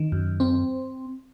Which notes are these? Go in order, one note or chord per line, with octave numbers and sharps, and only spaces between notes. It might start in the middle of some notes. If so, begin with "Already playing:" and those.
Already playing: D#3
F#2
C4